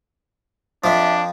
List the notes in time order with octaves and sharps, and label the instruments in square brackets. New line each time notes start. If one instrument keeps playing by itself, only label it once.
[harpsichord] F2 F3 [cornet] D4 [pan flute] E5